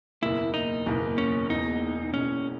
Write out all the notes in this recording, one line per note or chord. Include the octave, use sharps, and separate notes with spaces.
F#1 E2 B2 A#3 E4
D#4
F#1 E2 B2 A#3
C#4
E1 E2 B2 D#4
E1 E2 B2 C#4